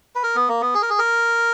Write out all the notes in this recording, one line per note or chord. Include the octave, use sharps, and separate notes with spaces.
B4
A#4
B3
A#3
B3
G#4
A#4
G#4
A#4